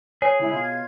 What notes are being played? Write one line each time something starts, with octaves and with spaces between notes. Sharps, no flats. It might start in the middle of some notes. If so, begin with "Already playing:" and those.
G#4 C#5 G#5
C#2 C#3 E4
B2 F4 G#6